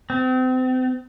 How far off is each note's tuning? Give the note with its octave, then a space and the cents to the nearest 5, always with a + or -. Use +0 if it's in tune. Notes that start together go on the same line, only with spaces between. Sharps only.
C4 -35